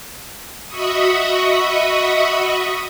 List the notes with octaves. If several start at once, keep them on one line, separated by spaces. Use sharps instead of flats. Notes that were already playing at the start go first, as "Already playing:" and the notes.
F#4 D#5 E5 B5 C#6 D#6